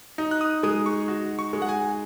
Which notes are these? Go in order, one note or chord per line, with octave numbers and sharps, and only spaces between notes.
D#4
F#6
D#6
G#3 D#6
C#6
F#4
C#6
G#3
F#5
G#5